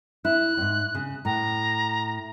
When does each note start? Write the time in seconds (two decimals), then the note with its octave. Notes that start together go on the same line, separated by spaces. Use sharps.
0.25 E4 F#6
0.57 E2 G#2
0.95 C#3
1.25 A2 A#5